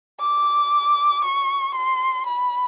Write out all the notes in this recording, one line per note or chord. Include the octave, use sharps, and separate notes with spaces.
D6
C#6
C6
B5